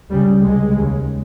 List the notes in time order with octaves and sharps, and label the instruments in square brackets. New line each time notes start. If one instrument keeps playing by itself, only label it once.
[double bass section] C#2 C#3 G3
C#2 C3 G#3
D#2 C#3